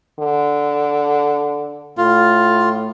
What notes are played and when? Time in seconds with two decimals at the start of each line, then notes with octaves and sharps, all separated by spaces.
0.19 D3
1.98 A2 F4